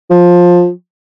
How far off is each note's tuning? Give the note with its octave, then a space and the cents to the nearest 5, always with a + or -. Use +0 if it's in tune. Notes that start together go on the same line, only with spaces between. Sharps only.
F3 +15